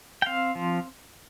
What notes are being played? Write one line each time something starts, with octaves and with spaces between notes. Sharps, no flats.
G5
C4 F5
F3